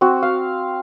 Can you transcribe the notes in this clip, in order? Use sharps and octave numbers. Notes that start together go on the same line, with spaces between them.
C4 F#4
F5